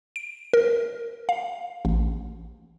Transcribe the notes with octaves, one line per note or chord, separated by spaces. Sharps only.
D7
A#4
F5
A1